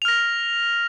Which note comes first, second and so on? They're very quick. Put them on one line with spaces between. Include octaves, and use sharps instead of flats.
F7 F6 A#6